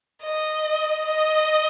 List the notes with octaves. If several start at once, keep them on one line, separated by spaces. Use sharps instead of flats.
D#5
D#5